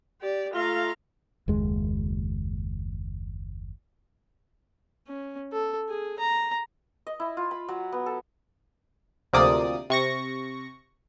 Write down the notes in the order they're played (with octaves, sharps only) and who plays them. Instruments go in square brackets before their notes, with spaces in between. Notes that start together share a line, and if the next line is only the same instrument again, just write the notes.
[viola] G4 D5
[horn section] A3 F4 [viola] F5 A#5
[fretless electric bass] F#1 D#2 G#3
[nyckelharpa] C#4
A4
G#4
A#5
[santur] D#5
E4
F4
B5
F#3
B3
A4
[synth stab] D2 C3 F3 A#3 D5 D#6
C3 C#6 A#6